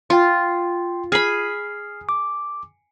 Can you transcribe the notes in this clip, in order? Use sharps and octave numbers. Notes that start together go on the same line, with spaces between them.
F4 G5 C6
G#4 B5 F6 C7
D6